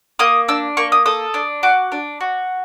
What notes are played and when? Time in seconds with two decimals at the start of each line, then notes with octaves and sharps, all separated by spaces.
0.19 A#3 D#6
0.48 D4 E6
0.77 A#3 C#6
0.92 D#6
1.06 A4 D#6
1.34 D4
1.63 F#4 D6
1.92 D4
2.21 F#4